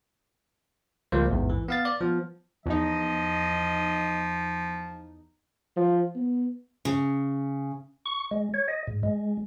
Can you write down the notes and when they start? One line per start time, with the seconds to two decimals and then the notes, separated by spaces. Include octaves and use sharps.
1.12 C#2 F3 G3 A#3 C5
1.29 A1 E2 G#2
1.49 E3
1.68 B3 F5 A6
1.85 D5
2.00 F3 B3
2.66 E2 F3 D#4 D#5
5.76 F3
6.15 B3
6.85 C#3
8.06 C#6
8.31 G#3
8.54 C#5
8.68 D#5
8.87 G#2
9.03 G#3